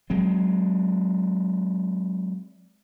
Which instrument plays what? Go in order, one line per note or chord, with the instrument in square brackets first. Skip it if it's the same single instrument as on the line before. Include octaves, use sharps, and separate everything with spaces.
[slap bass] F#3 G#3 C4